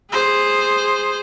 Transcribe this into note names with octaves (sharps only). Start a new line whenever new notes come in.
G#4 C5